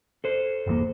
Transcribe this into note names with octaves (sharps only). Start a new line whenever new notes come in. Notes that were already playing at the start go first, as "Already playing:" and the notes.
A4 C5
G1 E2 A#3